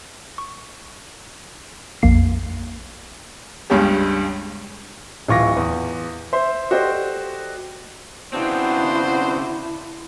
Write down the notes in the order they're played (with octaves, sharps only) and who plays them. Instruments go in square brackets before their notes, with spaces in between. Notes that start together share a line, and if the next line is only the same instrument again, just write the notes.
[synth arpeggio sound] C#6
A#1 F2 A#3 C7
[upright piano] C#2 G2 G#3 C#4 G4
[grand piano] D1 E3 F4 C#6 D6 A#6
E2
C5 E5 C6
F#4 G4 A4 C5 D5 D#5
[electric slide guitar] C#3 C4 [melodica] B3 D4 F#4 [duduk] E4 [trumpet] C5